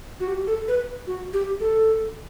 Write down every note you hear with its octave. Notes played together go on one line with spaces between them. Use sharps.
F#4
G4
A4
B4
F#4
G4
A4